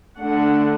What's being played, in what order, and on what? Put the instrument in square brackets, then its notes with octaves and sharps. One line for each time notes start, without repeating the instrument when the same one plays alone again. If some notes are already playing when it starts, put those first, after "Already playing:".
[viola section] D3 A3 D4 F#5